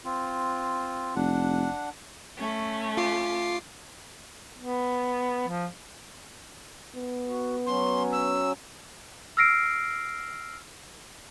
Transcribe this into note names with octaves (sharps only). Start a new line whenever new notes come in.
C4 F4
F1 D4 F#5
A3 C#4
F4 D6 C7
B3
F3
B3
F#4
F#3 C#4 C6
E6
E6 F6 A#6 C7 D7